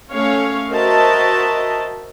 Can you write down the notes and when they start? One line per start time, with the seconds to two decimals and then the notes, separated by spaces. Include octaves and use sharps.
0.12 A3 C#4 C#5 F5
0.70 F#4 A#4 C5 D#5 E5 A5